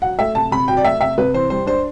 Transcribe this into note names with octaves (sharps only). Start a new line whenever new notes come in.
F#3 F#5
A3 E5
C3 A5
C3 B5
F#3 G5
D5
A3 E5
C3 E5
C3 B4
E3 C5
G3 C5
D4 C5